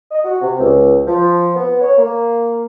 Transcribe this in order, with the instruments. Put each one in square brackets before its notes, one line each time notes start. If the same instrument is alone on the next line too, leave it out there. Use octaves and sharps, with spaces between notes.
[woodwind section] D#5
F#4
C3
C#2
F3
B3
C#5
A#3